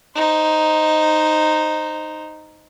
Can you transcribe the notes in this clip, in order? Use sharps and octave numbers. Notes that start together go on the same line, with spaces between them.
D#4 C5